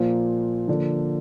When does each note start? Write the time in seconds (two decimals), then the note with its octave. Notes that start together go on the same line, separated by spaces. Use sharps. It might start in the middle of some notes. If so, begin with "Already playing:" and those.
Already playing: A#2 F3 A#3 F4 C5
0.68 D3 F3 A#3